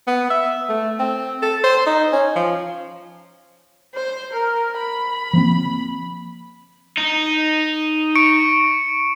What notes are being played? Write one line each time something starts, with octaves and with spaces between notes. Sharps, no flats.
B3
E5
A3
C4
A4
C5
D#4
C#4
F3
C5
A#4
B5
F3 A#3 C4
D#4
C#6 C#7 D7